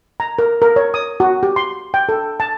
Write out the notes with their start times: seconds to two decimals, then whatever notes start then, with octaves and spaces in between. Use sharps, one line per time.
0.20 A#5
0.39 A#4
0.62 A#4
0.76 C#5
0.94 D#6
1.20 F#4
1.43 G4
1.56 C6
1.94 G5
2.09 A4
2.40 A5